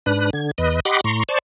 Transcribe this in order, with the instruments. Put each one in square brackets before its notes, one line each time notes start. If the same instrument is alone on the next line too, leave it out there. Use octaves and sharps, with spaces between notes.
[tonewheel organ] G#2 D4 B4 F#6
D3 G#6
E2 B4 D#5
G4 D#5 F#5 B5 C6 D6
A2 A#5 C6 C#6
C5 D5 A5 C#6